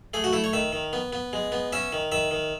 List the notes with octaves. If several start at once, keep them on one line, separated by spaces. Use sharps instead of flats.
A3 G#4
F#4
A3 E4
C#5
D#3 E5
D#3
B3
B3
G#3
B3
C#4 E5
D#3
D#3 E5
D#3